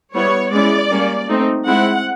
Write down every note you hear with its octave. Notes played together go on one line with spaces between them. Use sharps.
G3 B3 E4 C#5
G#3 C#4 E4 D5
G3 A#3 C#4
A3 C4 D#4
G#3 C4 E4 F#5